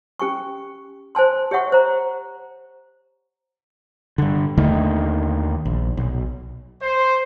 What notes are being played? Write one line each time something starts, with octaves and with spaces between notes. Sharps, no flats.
C#4 G4 G#5 C#6
C5 G#5 A5 C6
G4 C#5 E5 F#5 C#6
C5 A#5
G2 D3
D#2 D3 D#3 A3
A#1
B1
C5